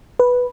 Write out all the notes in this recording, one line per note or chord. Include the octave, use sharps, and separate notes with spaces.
B4